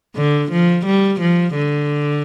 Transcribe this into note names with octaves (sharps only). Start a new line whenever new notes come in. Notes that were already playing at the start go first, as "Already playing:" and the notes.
D3
F3
G3
F3
D3